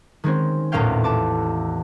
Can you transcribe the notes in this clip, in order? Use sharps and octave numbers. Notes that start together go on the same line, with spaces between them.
D#3 G#3 C4 C#4
A1 E2 A#2 C#4 F5 G5
A5 D6